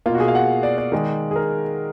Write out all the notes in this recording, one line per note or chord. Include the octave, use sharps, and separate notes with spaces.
B2 A#3 F4
F#4
G#4
F5
F#5
D5
D5
D#3 G#3
G#4
A#4